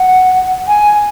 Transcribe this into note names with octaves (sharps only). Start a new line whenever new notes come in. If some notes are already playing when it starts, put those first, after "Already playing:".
Already playing: F#5
G#5